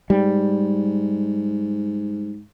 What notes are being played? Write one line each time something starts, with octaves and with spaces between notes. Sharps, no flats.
G#2 G3